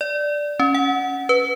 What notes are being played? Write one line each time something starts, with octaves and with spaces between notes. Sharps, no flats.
D5
C#4
F#5
B4